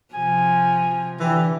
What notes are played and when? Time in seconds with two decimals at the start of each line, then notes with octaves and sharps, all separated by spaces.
0.14 C3 F3 G#5
1.20 D3 E3 G4